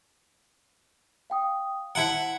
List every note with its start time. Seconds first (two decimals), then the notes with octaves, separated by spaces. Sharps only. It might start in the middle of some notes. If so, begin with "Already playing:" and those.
1.30 F5 G5 D#6
1.95 E4 C5 F#5 A5 A#5